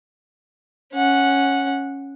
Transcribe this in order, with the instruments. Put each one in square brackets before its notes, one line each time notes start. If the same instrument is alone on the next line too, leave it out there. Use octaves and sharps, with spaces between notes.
[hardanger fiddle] C#4 F#5